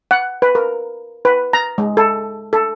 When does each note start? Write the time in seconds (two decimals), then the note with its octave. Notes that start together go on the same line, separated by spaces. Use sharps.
0.11 F#5
0.42 B4
0.55 A#4
1.25 B4
1.53 A#5
1.78 G#3
1.97 A4
2.53 A4